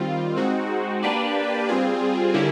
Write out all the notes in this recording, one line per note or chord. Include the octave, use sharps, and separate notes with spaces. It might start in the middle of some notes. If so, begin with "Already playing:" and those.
Already playing: D#3 G3 C4 F4
G#3 C4 D#4 F#4
A#3 D4 G4 B4 D5
G3 C4 F4 G#4
D3 G3 A#3 C#4 E4